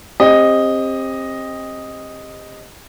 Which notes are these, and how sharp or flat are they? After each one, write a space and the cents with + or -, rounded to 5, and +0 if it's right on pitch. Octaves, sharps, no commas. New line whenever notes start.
C4 +25 G4 +30 D#5 +0